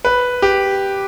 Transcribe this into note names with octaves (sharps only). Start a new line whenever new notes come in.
B4
G4